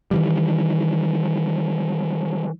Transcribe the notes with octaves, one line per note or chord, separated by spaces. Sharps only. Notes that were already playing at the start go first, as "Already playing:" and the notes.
D#3 E3 G3